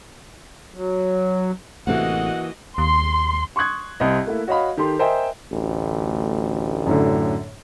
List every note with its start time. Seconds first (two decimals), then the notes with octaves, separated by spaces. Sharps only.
0.74 F#3
1.87 A1 C3 E3 A3 A#3 F#4 D#5 F#5
2.78 D#2 C6
3.56 C6 C#6 D#6 F#6 G#6
4.00 C2 C3 C4 D#5
4.27 A3 A#3 E4
4.47 F#4 C#5 D#5 F5 B5
4.77 D#3 G4 A4 C6
4.99 A#4 C5 D#5 E5 G5 G#5
5.52 A1 D2
6.87 F#2 A2 D3